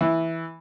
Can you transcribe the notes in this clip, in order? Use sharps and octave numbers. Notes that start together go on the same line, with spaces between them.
E3